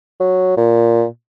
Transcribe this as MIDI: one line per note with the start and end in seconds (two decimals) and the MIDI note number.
0.20 0.53 54
0.57 1.05 46